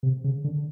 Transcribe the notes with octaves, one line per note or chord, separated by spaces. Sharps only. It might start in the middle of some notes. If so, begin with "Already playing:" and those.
C3
C#3
D3